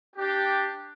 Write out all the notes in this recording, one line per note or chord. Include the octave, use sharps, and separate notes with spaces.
D4 G4